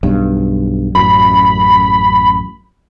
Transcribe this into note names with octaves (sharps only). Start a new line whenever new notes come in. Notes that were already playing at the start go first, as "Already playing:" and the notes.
B1 G2
A1 F#2 B5